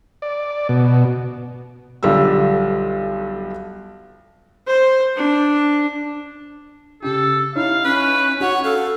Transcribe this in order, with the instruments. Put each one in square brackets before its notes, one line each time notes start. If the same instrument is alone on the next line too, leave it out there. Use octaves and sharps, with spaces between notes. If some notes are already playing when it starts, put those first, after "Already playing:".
[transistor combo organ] D5
B2
[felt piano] B1 D3 G3 F4 E6
[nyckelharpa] C5
D4
[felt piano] C#3 G4 [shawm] A4
[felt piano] D#4 E4 C#5 [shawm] F5
[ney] C#4 [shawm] B4
[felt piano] F#4 [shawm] C#5 [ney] F#5
[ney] A4 [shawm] F5